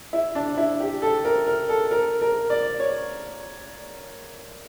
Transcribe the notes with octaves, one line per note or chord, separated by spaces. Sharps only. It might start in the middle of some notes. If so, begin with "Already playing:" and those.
E4
D4
E4
G4
A4
A#4
A#4
A4
A#4
A#4
D5
C#5